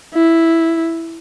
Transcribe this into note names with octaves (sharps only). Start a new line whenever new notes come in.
E4